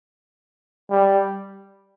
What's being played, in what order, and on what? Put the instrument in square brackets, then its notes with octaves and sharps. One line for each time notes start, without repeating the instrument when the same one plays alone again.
[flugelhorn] G3